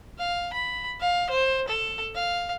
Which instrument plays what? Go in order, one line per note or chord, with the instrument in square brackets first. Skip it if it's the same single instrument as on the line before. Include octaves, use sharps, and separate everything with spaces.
[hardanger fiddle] F5
B5
F5
C5
A4
F5